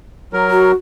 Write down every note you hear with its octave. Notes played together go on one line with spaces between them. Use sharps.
F#3 A#4
F#4